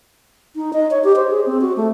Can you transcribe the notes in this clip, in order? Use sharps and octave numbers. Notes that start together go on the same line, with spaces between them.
D#4
D#5
C#5
G4
C5
G#4
C4
F#4
A3